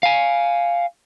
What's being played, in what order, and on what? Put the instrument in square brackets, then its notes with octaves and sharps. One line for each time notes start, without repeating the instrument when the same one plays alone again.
[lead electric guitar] F5 G#5